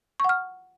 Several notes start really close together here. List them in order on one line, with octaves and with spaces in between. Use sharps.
C#6 F#5 F6